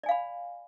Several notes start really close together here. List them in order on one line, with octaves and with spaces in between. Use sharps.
D5 G#5 F5 B5